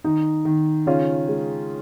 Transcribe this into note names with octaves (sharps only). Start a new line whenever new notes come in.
D#3 D#4
D#3
C#3 C#4 F4
G#3